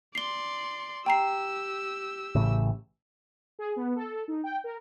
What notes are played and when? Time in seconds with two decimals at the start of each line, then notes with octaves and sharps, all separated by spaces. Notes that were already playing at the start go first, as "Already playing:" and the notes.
0.15 D5 C6 C7 G7
1.06 G4 G5 A#5 E6 C7
2.35 A1 A2 C#3
3.59 G#4
3.76 B3
3.96 A4
4.28 D#4
4.44 G5
4.64 A#4